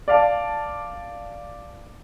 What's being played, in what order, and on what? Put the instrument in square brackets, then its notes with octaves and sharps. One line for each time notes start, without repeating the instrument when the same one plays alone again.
[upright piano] D5 F5 A5